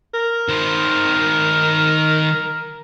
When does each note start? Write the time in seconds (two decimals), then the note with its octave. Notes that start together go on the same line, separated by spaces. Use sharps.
0.14 A#4
0.49 D#3 C5